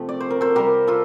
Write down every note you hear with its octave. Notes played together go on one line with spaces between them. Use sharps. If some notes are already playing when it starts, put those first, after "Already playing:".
Already playing: C3 F3 A3
D5
C5
A#4
A4 C5
C3 G3 G4 A#4
F4 A4